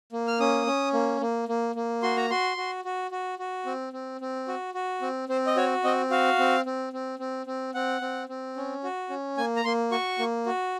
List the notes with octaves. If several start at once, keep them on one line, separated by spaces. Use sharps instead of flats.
A#3
F6
C#4 D#6
C#4
A#3
A#3
A#3
A#3
F#4 C6
A#5
F#4 C6
F#4
F#4
F#4
F#4
C4
C4
C4
F#4
F#4
C4
C4 C5
D#5
F#4 C#5
C4 D#5
F#4 F5
C4
C4
C4
C4
C4
C4 F#5
C4
C4
C#4
F#4
C#4
A#3 G#5
A#5
A#3 C6
F#4 C#6
A#3
F#4